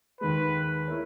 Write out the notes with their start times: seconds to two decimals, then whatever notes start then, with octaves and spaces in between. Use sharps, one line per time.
0.21 D#2 D#3 G#3 B4
0.88 A#3 E4 A#4 C#5